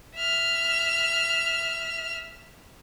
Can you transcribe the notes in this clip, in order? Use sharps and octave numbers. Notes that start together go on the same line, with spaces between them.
E5 F6